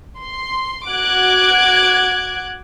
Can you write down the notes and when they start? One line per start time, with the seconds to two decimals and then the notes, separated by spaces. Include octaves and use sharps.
0.20 C6
0.90 F#4 D6 F#6 G#6